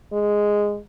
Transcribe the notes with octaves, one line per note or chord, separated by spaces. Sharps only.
G#3